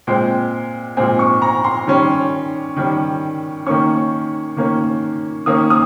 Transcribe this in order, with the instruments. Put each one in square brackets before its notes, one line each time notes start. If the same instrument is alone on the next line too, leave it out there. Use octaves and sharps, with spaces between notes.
[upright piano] A#2 G#3 C4 G5
A#2 G#3 C4 G#5
C#6
A#5
C6
D#3 G3 C#4
D#3 G3 C#4
D#3 A#3 C#4 C#6
D#3 A#3 C#4
D#3 A#3 C#4 D#6
D#6